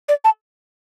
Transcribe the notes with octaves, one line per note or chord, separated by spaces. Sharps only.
D5
A5